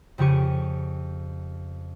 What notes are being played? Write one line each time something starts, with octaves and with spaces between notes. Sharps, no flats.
F2 C#3 C#4 G4 C#6 D#7